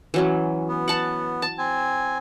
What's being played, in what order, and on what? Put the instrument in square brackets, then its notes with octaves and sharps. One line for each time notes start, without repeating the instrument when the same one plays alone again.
[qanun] E3 F#3 C#4
[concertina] B3
[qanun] F#5 A5 C#6
A5
[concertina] C4 G#5